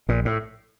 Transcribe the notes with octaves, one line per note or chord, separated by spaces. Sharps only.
A#1 A#2
A2